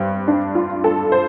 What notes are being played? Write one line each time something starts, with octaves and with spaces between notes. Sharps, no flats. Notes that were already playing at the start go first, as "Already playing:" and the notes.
Already playing: G2 G3 C4
D4
F4
A4
C5